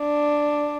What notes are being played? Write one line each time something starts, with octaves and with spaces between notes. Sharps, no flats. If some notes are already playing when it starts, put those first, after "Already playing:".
Already playing: D4